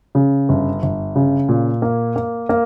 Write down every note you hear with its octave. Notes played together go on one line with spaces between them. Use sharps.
C#3
G1
G1
C#3
A#2
A#3
A#3
A#3